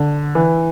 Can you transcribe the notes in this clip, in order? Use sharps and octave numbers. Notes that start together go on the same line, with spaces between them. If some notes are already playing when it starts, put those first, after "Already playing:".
Already playing: D3
E3